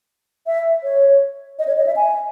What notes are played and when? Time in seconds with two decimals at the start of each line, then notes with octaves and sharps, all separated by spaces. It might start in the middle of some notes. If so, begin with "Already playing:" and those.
0.47 E5
0.83 C#5
1.59 D#5
1.67 C#5
1.77 D#5
1.87 E5
1.96 G#5